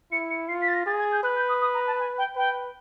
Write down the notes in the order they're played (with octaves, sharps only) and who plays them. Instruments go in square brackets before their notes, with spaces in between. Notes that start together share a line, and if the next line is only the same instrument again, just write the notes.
[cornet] E4 [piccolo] C#7
[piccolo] C#7
[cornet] F4 [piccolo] C7
[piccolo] B6
A6
A#6
[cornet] G#4 [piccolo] A6
[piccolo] G#6
G6
[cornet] B4 [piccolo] F#6
[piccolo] G6
D#6
D#6
A#5
A5
G#5
G5
[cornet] B4 [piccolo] G5